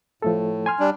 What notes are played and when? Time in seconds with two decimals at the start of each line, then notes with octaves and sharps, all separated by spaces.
0.22 A2 F3 A3 A4
0.66 G#5 C6 F6
0.79 G3 D4